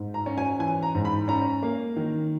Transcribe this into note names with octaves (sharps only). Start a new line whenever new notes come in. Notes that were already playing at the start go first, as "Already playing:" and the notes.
Already playing: G#2
A#5
C#4
G#5
E3 G#5
A#5
G#2
B5
C#4 A#5
A#3
D#3